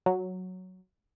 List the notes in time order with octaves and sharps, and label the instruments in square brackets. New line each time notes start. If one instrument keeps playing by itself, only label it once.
[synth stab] F#3